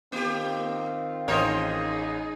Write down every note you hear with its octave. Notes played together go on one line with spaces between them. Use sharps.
D#3 A#3 C4 F4 G4
A1 D#4 G#4 A#4 C5 C#5 D#5